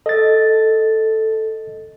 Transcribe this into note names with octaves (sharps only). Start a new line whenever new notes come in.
A4 D#5 A6